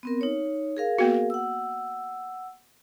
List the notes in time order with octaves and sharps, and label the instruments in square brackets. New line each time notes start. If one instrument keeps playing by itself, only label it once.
[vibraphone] B3 C4 A#4
D#4 C#5
G#4 A#4 F5
[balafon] A#3 B3 F#4
[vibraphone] F#5 E6